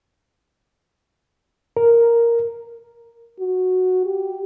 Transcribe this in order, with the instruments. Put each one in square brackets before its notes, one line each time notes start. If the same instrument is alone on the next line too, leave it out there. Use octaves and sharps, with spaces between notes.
[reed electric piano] A#4
[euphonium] F#4
G4